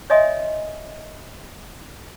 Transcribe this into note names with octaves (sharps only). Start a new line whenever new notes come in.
C#5 D#5 E5 G#5 C6 D#6